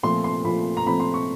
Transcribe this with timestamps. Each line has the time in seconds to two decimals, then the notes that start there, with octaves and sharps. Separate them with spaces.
0.03 A#2 F3 A3 C4 C6
0.24 C6
0.44 A#2 F3 A3 C4 B5
0.77 A#5
0.86 A#2 F3 A3 C4 B5
1.00 C6
1.14 C#6